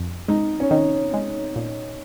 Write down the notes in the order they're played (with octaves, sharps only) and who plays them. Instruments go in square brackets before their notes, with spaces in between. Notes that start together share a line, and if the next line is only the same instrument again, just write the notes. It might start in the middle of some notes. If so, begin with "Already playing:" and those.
Already playing: [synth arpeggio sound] F2
[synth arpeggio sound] G#3 [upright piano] D#4
[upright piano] C#4
[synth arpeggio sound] D#3 [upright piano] D#4
[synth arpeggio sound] G#3
A#2